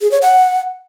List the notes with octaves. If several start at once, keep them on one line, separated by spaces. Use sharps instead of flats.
G#4
C#5
F#5